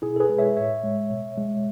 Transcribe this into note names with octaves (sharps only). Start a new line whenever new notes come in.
B2 E4 G#4
A4
G#4 B4
G#3
C#5 E5
A2 C#5 E5
G#3
B2
G#3